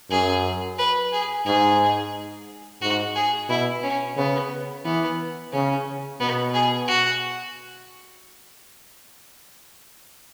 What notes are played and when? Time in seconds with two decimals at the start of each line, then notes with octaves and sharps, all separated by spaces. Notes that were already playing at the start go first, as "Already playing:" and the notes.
0.10 F#2 G#4
0.79 B4
1.13 G#4
1.46 G#2 G#4
2.82 G#2 F#4
3.16 G#4
3.49 B2 E4
3.83 C#4
4.17 C#3 B3
4.85 E3 B3
5.53 C#3 C#4
6.20 B2 B3
6.54 G#4
6.88 F#4